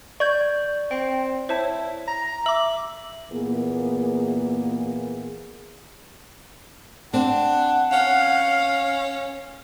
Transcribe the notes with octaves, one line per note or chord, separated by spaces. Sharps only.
D5 C#6 G6 G#6
C4 G5
E4 C5 C#5 A5
A#5
E5 D6 E6 F#7
A#2 E3 A#3 B3 G#4
C4 D4 F#5
C#4 F5